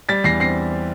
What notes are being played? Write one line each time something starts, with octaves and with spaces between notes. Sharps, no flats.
G3 A6 B6
E2 A#6 C7
C4 A#6 C7